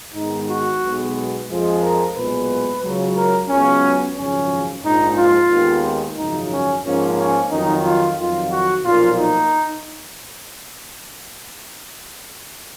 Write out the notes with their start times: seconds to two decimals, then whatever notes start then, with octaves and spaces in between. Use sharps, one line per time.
0.15 G#2 D#3 G#3 B3 D#4
0.48 F#4
0.82 B1 B2 G#3 B3
1.49 F2 F3 G#3
1.82 A#4
2.15 B1 A#2 G#3 B3 B4
2.82 C#2 C#3 F#3
3.16 A#4
3.49 C#2 C#3 F#3 B3 C#4
4.16 G#1 F#2 C#3 F3 C#4
4.83 A#1 G#2 F3 G#3 D#4
5.16 F4
5.50 D#2 D#3 G#3 B3
6.17 G#1 F#2 C#3 F3 D#4
6.50 C#4
6.83 G#2 F3 A#3 C#4
7.17 C#4
7.50 F2 D#3 F#3 D#4
7.84 F4
8.17 F2 D#3 F#3 F4
8.51 F#4
8.84 B1 A#2 F3 A#3 F4
9.17 D#4